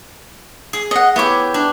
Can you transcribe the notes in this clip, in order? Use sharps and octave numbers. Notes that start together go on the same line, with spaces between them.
G#4
D#5 F#5
B3 E4 G4 C#5 D6
D4